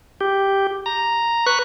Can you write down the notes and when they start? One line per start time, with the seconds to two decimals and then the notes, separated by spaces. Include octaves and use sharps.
0.21 G4
0.86 A#5
1.46 B4 C#6 F#6